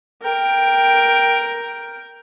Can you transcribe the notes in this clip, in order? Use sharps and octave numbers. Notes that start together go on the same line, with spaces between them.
A#4 G5